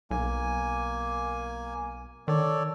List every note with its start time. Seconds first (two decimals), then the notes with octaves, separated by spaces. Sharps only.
0.11 B1 A#3 G#5
2.28 D#3 A4 C#5 D5